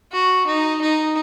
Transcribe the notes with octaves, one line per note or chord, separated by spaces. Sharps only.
F#4
D#4
D#4